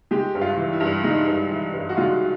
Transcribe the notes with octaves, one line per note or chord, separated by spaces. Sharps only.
G#3 G4
G2
F4
E3
E4
G2
G#3 D#4
G2
E3
G2
F#4
G#3 F4